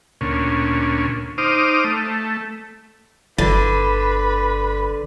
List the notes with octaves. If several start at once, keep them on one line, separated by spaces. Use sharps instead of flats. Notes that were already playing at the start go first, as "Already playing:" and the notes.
D2 A#2 C#4
D#4 C5 D6 D#6 F6
A3
G1 D3 B4